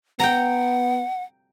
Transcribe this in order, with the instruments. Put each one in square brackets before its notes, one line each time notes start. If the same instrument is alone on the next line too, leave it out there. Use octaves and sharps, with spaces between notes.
[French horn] B3 [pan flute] F#5 [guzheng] G5 A#5